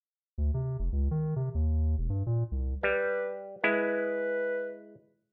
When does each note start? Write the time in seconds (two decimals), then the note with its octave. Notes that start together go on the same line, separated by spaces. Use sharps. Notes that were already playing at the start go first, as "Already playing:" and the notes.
0.38 D2
0.54 C3
0.79 F1
0.92 C#2
1.11 D#3
1.36 C3
1.55 D#2
1.98 E1
2.10 G2
2.26 A#2
2.52 C2
2.83 G3 B4
3.64 G#3 E4 B4